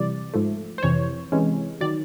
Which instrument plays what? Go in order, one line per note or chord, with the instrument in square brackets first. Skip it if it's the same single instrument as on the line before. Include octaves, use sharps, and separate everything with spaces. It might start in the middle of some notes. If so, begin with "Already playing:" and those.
Already playing: [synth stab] C3 E3 G3 D5
G#2 F3 A3
C5
F2 C3 E3 C#5
C3 E3 G#3 C#4
D#3 F#3 D5